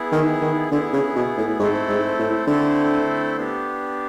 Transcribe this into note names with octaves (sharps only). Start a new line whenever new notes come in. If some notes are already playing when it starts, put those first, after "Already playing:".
Already playing: B3 E4 G#4
D#3
D#3
D3 B3 E4 G#4
C#3
B2
A2
G#2 A3 C4 E4 A4 C5
G#2
A2
D3 A3 C4 E4 A4 C5
B3 D4 G4